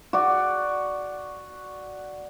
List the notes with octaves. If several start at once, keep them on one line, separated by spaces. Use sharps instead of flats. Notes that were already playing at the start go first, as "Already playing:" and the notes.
F#4 D5